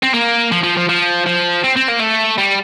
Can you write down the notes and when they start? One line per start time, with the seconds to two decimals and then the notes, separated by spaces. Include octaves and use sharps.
0.03 C4
0.14 A#3
0.52 F3
0.63 F3
0.77 F3
0.89 F3
1.26 F3
1.64 C4
1.77 C4
1.89 A#3
2.00 A3
2.38 G3